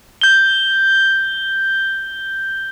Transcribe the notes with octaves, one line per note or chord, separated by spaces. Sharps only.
G6 G7